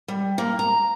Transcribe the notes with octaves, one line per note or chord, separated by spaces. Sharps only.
G3
A#3
A#5